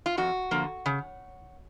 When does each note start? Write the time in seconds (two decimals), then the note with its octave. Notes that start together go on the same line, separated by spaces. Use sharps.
0.06 F4
0.17 F2 F#4
0.51 D3 F3 A#3
0.86 C#3